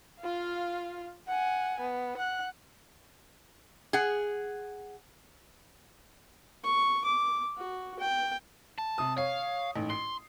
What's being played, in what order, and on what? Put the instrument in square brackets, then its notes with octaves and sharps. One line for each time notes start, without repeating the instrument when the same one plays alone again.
[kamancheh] F4 F5
F#5 G#5
B3
F#5 F#6
[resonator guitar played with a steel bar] G#4 F#5
[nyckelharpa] C#6
D6
F#4
G5
[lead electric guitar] A5
[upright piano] C3 D#6
[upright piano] C#5 [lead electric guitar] F5
[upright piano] A1 G#2
[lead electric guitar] C6 [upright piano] C7